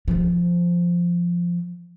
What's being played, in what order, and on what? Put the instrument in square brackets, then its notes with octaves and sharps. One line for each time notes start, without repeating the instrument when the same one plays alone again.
[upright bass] D#3 F3